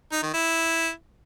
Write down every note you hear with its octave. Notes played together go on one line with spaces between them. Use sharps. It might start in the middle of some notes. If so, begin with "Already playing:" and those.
D#4
D#3
E4